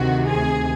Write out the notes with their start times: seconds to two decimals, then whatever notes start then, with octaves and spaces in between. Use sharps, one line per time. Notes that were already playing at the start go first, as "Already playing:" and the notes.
Already playing: D2 C3 D#3 F#4
0.27 G#4